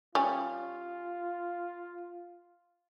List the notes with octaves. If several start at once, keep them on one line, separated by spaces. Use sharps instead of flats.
G3 C#4 F4